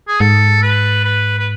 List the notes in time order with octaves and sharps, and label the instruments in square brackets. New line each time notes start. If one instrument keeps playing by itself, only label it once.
[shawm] G#4
[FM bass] G#2 [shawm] A4
[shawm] B4
B4
B4